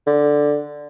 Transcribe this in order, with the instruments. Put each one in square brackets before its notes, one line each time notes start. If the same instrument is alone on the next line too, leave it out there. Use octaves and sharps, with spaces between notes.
[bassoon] D3